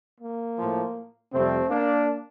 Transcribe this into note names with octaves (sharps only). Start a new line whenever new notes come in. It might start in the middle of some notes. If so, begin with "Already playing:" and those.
A#3
A2 F3
F2 C3 G3 A3 C4
A#3 D4